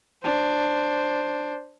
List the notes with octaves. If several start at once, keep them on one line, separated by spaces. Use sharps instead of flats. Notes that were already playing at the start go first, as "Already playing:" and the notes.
D4 C5